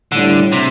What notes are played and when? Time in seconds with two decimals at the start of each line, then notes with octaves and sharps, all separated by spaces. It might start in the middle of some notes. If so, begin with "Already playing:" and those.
0.12 A2 D3 G3 D4
0.52 C3